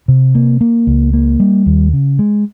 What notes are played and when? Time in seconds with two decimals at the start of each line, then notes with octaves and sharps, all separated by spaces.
0.08 C3
0.35 A#3
0.61 A#3
0.87 C#2
1.13 A#3
1.40 G3
1.66 D#2
1.93 C#3
2.19 G#3